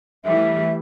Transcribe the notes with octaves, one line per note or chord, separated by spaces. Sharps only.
E3 G3 A3 E5